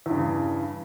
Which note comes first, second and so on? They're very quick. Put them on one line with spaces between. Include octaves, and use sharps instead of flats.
E2 G2 C#3